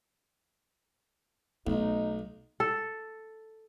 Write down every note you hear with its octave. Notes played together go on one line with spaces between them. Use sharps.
B1 A3 B3 D#4
A4